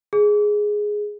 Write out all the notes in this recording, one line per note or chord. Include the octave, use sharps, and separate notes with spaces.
G#4